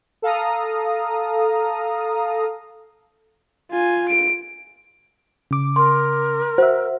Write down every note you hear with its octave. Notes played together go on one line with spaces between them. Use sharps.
A4 F5 A#5 D#6
F4 G#5
D7
C#3 D6
A#4 C6
F#4 C5 E5